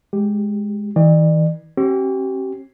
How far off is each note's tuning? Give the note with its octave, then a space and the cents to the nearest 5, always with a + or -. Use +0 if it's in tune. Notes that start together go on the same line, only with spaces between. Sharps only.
G#3 +0 G4 +0
E3 -45 D5 +35
C4 +45 G4 -40